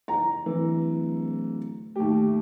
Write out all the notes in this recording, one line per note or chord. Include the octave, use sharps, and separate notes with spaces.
A#5
D1 E3
D#2 A3 G4